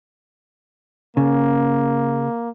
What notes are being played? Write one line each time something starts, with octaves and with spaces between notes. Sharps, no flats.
C#3 A#3